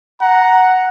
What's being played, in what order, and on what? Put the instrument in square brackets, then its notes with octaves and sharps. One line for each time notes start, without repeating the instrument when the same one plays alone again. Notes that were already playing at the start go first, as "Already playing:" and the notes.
[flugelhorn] F#5 [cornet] A#5